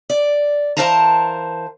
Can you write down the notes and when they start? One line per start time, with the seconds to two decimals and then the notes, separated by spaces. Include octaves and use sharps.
0.10 D5
0.77 E3 A#4 C5 F5 A5 A#5